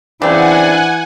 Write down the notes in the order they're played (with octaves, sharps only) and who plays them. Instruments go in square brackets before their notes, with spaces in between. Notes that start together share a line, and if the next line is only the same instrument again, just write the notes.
[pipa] C#3 C4 [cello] E3 [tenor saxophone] D4 [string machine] F#5 G#5